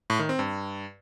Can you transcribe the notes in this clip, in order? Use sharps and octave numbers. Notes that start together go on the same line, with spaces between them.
A2
D#3
C4
G2